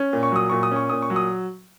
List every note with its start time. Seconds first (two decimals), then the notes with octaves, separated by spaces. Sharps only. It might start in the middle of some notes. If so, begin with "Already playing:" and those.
Already playing: C#4
0.13 A#2
0.23 C#6
0.32 F#3 D#6
0.50 A#2 C#6
0.63 D#6
0.72 C#4 C#6
0.89 A#2 D#6
1.02 C#6
1.10 F#3
1.16 D#6